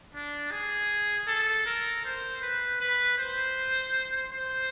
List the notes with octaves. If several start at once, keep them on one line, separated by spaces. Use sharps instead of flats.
D4
G#4
A4
A#4
C5
B4
B4
C5
C5